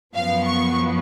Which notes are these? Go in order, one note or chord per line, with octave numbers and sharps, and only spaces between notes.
F#2 F3 B3 F5
C#6